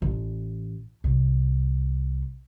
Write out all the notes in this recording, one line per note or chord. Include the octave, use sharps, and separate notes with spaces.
A1
C2